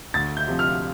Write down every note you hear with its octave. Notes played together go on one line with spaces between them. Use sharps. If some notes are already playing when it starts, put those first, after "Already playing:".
D2 A6
G6
C3 F3
F6